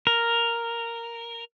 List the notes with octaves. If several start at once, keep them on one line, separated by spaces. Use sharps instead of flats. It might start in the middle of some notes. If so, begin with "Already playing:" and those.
A#4